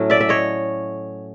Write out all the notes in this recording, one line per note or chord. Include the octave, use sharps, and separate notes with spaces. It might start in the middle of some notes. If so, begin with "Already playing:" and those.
Already playing: A2 F#3 A3 C#4
D5 E5
E5
C#5 D#5